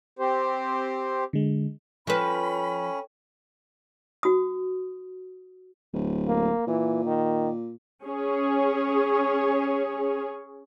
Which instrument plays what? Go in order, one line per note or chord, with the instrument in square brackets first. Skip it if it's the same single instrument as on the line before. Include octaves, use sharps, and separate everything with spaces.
[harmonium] C4 G4 C5
[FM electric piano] D3 G#3
[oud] F3 B4 [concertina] C#4 [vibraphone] A4 C#5 G5 [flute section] B5
[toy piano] F#4 D#6
[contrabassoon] D1
[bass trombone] A#3
[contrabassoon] A#2 [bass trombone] E3
[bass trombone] D#3
[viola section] C#4 G#4 C#5